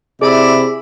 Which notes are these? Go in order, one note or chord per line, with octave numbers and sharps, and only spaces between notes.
C3 E4 G#4 D5